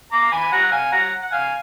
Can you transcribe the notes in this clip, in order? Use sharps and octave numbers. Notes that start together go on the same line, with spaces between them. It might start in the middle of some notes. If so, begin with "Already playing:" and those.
A#5 D6
G#5 B5
F#5 A#5
F5 G#5
F#5 A#5
F#5
F5 G#5